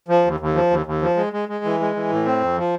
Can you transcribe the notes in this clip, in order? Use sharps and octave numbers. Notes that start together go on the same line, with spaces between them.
F3
D#2
D#2
F3
D#2
D#2
F3
G#3
G#3
G#3
E3
G#3
E3
A2
C4
F2
F3